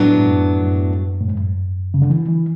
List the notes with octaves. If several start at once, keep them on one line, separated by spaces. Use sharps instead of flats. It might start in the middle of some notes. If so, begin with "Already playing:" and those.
Already playing: A2 F#3 B3 D4
G#2
F#2
F#2
A2
G#2
F#2
C#3
D3
E3
E3